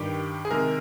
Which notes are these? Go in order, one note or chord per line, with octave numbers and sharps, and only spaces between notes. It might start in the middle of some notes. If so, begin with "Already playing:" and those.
Already playing: G2 D#3 G3 G4
G#4
C3 D#3 G#3 A#4